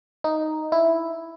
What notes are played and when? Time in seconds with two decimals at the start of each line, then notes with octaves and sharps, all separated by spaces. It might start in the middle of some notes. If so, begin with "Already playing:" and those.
0.24 D#4
0.72 E4